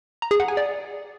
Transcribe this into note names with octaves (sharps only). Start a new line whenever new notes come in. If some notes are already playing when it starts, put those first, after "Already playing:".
A#5
G#4
F#5
G#5
D5